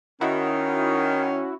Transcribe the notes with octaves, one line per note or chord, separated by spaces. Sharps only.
D#3 C#4 E4 F#4